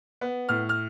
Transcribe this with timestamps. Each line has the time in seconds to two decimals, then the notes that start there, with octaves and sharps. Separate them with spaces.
0.21 B3
0.49 A2 F6
0.69 F6